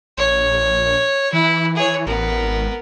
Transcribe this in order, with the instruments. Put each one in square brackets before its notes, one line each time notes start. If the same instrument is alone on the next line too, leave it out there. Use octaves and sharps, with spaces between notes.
[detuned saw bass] A#1 [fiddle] C#5
[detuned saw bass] E3 [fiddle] E4
[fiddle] G#4 C#5
[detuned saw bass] A1 [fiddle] B3 A#4
[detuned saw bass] G#1